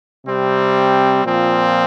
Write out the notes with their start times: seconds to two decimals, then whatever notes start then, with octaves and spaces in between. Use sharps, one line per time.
0.24 C3 G3 C4
1.23 A#2 F3 C4